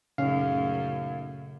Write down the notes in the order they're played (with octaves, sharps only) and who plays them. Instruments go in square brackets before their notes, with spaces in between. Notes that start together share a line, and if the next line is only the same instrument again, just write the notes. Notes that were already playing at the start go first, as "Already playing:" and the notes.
[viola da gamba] F#2 A3 [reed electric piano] A#2 C#4 D#4 [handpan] C#3 [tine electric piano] F5